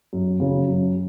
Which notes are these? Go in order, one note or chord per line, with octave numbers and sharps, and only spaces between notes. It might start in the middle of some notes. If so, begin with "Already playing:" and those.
F#2
C#3 F#3
F#2